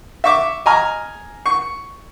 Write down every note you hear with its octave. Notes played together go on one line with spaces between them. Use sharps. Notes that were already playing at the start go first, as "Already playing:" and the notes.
E5 C#6 D6
D#5 G#5 A#5 F6
C#6